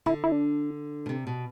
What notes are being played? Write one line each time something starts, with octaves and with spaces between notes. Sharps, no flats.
D3 E4
E4
D4
B2
C3
B2